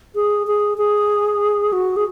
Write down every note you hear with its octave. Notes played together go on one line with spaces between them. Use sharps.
G#4
G#4
G#4
F#4
G#4